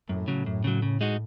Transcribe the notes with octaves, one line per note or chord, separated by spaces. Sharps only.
F#2 A2
C#3 F#3
F#2
C#3 F#3
C#3
G#3 D#4 F#4